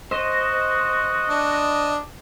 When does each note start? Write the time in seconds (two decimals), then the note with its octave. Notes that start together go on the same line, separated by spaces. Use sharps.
0.11 F#4 C5 D#5
1.30 D4